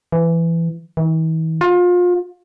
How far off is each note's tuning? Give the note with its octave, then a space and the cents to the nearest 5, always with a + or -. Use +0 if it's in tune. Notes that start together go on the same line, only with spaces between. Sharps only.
E3 +15
E3 -45
F4 +30